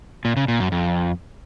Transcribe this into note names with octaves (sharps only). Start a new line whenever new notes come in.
A#2
C#3
A#2
F#2
F2